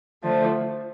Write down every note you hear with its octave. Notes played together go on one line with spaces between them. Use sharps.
D3 F3 A3